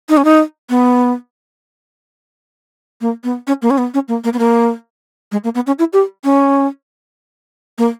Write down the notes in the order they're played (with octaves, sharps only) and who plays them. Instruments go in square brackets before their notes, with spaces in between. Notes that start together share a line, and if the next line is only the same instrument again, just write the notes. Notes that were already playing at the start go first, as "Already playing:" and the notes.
[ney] D#4
C#4
D#4
B3
A#3
B3
C#4
A#3
C#4
B3
C#4
A#3
A#3
B3
A#3
G#3
A#3
B3
C#4
E4
G4
C#4
A#3